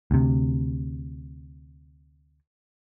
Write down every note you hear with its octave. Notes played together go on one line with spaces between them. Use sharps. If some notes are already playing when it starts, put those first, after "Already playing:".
D2 C3